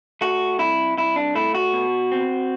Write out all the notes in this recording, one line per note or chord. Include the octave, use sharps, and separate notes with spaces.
A3 F#4
C2 E4
C2 E4
D4
A3 E4
F#4
B2
C4